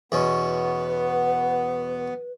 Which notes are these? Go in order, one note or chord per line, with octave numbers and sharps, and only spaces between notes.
E2 B2 B3 C#4 B4